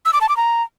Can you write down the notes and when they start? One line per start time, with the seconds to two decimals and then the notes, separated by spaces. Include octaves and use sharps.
0.05 E6
0.13 D6
0.21 A5
0.29 D6
0.37 A#5